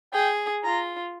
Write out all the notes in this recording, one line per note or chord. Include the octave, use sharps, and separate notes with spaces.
G#4 G5
F4 A#5